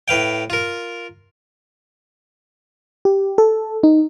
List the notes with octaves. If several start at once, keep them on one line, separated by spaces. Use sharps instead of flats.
A2 B4 F5 G5
F4 A#4
G4
A4
D#4